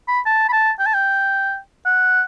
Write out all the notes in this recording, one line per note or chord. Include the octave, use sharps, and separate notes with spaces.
B5
A5
B5
A5
G5
A5
G5
F#5